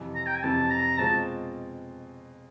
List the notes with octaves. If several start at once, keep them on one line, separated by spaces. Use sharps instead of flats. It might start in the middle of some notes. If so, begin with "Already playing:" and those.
Already playing: F2 C3 E3
A#5
G5
G#5
F2 C3 E3 A5
A#5
B2 G#3 C4 F4 A5